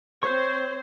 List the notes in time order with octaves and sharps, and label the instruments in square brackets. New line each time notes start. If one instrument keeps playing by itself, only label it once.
[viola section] C4 C5 [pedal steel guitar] C#5 C#6